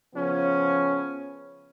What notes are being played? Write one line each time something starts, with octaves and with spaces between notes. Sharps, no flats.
C#3 F3 B3 C#4